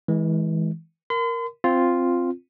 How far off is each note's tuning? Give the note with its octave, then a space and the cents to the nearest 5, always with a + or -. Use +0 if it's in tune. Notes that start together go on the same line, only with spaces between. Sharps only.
E3 -25 G#3 +15
A#4 +0 C6 -45
C4 +0 F4 +0